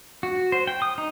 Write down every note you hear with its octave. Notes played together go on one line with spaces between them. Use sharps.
F#4
C5
G5
D#6
D#4